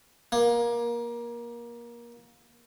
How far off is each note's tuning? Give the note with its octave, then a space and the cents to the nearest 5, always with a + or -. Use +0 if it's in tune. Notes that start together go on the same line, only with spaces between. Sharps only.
A#3 +25